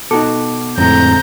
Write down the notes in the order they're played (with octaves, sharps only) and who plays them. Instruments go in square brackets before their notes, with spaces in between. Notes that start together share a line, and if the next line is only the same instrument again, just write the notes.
[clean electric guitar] B2 [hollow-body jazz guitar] D#4 F#4 A4 [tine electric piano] D6
[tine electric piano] F2 A2 [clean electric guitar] D3 G#3 C4 [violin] A#5 G6